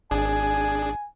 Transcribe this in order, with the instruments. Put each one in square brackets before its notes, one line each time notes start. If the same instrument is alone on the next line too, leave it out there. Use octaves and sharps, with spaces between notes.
[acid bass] G#1 [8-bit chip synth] D4 G#4 [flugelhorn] G#5